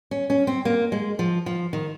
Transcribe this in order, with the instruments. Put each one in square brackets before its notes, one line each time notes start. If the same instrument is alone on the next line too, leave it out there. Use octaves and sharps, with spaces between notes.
[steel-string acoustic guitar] C#4
C#4
C4
A#3
G#3
F3
F3
D#3